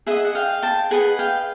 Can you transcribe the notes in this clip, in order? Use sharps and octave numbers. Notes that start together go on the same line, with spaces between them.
G#4 B4 D#5 E5 F#5
F#5
F5 G5
G5 A5
G#4 B4 D#5 F#5 G#5
F5 G5